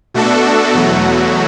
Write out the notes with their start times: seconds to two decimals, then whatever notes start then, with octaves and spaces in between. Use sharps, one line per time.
0.14 B2 A3 D4 F#4 A4
0.75 E2 B2 F#3 A3 F#4